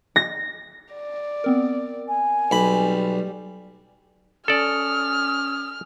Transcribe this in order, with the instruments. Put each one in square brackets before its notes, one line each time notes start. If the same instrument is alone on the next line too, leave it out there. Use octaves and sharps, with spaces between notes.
[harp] A#6
[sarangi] D5
[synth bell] B3 C4 A#4
[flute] G#5
[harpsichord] B1 B5 [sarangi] G3
[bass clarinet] C#4 [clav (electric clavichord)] A4 D5 [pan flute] D#6 [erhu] F6